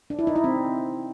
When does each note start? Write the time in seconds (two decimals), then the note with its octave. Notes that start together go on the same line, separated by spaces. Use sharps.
0.10 D4
0.19 E4
0.27 D#4
0.36 E4
0.44 C4